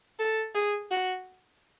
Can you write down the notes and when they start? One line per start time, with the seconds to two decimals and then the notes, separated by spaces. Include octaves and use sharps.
0.19 A4
0.55 G#4
0.91 F#4